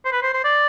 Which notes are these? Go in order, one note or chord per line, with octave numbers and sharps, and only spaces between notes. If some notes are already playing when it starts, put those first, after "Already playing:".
C5
B4
C5
C5
D5